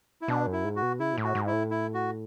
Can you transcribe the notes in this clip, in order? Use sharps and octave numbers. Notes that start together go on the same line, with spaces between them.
E4
B2 D4
F#2
E4
G#2
F#4
B2
C#3 E4
B2
A2
F#4
G#2
E4
A2
E4
F#4